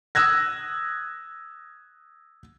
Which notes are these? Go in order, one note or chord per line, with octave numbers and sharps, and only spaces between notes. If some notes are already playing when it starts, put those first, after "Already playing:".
D#6 E6 F#6 G#6 A#6